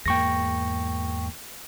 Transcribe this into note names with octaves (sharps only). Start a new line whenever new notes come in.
E2 G#2 A#3 G5 C#6 A#6